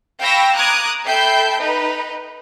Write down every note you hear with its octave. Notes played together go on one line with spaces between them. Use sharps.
F5 G5 B5 C#6 E6 A#6
A#5 D6 D#6 F#6 G#6
A4 E5 G5 B5 G6 C7
D#4 B4